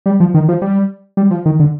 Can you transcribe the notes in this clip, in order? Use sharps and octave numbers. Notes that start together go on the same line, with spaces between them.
G3
F3
D#3
F3
G3
G3
F3
D#3
D3